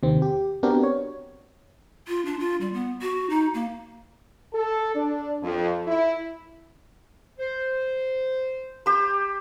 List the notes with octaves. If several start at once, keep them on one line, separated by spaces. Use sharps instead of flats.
D#2 C3 D#3 C4
G4
B3 C4 D4 F#4 G4 A#4
C#5
F4
D4
F4
G3
B3
F#4
D#4
A#3
A4
D4
F2
E4
C5
G4 C5